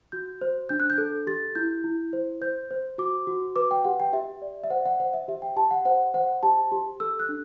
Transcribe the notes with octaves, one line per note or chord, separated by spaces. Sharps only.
F#4 G6
C5
D4 G6
F#6
G6
A4
G4 A6
E4 G6
E4
C5
C5 G6
C5
F#4 D6
F#4
B4 D6
G5
G4 F#5
G5
G4 E5
D5
E5
C5 F#5
F#5
C5 F#5
E5
G4 E5
G5
G4 A5
F#5
C5 F#5
C5 F#5
G4 A5
G4
A4 E6
F#6
D4